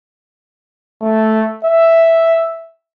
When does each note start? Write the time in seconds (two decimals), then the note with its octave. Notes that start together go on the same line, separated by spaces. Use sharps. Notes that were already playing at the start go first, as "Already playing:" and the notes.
1.02 A3
1.65 E5